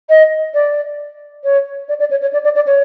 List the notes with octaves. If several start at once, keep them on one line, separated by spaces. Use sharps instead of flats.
D#5
D5
C#5
D5
D5
C#5
C#5
D5
D5
D5
C#5